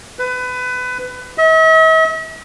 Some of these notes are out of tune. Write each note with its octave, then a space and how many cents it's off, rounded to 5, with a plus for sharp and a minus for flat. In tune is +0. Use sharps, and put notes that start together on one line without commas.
B4 +25
E5 -45